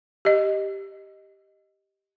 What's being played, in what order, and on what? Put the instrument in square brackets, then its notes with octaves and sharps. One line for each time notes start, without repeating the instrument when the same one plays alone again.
[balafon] G4 D#5